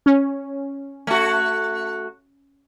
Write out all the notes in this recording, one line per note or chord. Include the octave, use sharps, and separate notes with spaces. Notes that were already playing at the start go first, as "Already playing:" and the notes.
C#4
A3 F#4